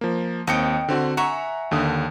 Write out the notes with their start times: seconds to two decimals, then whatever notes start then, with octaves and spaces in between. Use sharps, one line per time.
0.01 F3 A#3
0.47 D#2 C4 D#5 G5 D#6 C#7
0.88 D3 C4 F#4
1.17 E5 F#5 G#5 A#5 C#6
1.71 D#2 D3 D#6